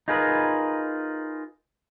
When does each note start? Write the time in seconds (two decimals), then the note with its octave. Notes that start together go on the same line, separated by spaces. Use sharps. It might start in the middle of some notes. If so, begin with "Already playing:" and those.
0.08 D#4 F4 G#4 A#4 B4